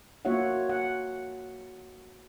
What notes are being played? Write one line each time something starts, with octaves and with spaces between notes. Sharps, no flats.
A#3 F4 F#4 C#5 E5 F#5
F#5